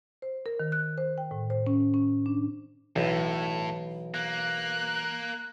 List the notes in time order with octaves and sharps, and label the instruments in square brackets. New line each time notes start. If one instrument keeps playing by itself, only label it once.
[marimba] C5
A#4
D#3
F#6
C5
G5
A2
C5
C#4
C#4
D4
[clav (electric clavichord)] B1 [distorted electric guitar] A2 [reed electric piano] E3
[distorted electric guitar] A#3 [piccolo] F#6